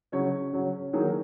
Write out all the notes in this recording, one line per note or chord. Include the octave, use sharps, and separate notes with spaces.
C#3 F#3 C#4 C#5
C#3 F#3 C#4
D#3 F#3 A#3 D#4 G#4
A#4